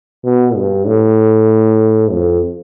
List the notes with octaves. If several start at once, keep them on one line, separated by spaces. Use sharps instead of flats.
B2
G2
A2
F2